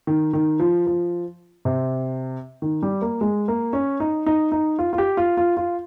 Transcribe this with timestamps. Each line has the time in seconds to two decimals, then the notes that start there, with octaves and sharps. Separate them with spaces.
0.07 D#3
0.33 D#3
0.59 F3
0.87 F3
1.65 C3
2.62 D#3
2.83 G3
3.02 A#3
3.21 G#3
3.48 A#3
3.73 C#4
4.00 D#4
4.26 D#4
4.52 D#4
4.79 F4
4.93 F4
4.98 G4
5.17 F4
5.37 F4
5.57 F4